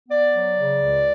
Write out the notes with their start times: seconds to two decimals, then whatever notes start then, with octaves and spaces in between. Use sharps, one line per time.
0.09 B3 D5
0.34 F#3
0.57 C#3
0.82 C#2